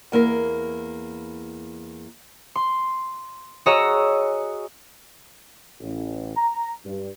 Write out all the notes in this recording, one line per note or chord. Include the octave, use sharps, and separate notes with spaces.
E2 A#3 E4 A#4
C6
F#4 G#4 C#5 D#5 A#5 E6
A1
A#5
G2